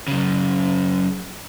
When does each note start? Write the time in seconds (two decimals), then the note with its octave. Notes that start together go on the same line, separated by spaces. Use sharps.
0.08 F#2 C#3